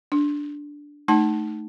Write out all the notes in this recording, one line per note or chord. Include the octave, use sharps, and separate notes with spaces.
D4
A3 D#4 A5